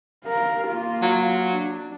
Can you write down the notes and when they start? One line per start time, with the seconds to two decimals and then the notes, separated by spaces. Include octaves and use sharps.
0.25 A#4 F5
0.68 A#3 F4
1.02 F#3
1.51 D4